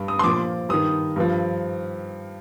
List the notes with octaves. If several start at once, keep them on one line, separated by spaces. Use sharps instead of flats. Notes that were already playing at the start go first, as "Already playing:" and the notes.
Already playing: G2
D#6
C6
A#2 F3 D6
G2 D#3 D#6
G2 F3